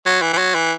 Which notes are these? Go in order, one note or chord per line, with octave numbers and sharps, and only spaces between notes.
F#3
E3
E3
F#3
E3